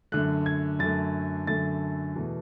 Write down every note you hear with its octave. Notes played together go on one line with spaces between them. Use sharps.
F#2 D3 A3 F#6
G#6
F#2 D3 A3 A6
F#2 D3 A3 A6
E2 B2 A3